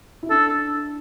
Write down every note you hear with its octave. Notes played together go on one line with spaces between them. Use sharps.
E4
D4 A4